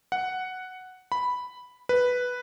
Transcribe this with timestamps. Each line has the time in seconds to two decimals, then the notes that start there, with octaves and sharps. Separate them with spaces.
0.12 F#5
1.12 B5
1.89 B4